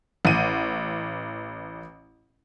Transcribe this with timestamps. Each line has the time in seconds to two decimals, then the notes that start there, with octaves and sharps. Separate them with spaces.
0.25 A1 D#7